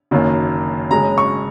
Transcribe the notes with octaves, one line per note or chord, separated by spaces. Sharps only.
F#1 F#2 D#3 A#3
F#1 F#2 C#3 G#3 A#5
C#6